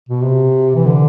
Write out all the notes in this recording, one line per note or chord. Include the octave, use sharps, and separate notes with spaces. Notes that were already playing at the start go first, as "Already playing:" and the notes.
B2
C3
E3
D3